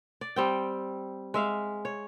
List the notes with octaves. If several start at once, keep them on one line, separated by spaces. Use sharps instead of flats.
D5
G3 C4 G5
G#3 E5 F5
C#5